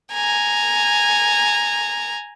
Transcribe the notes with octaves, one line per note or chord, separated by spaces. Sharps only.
G#5 A#5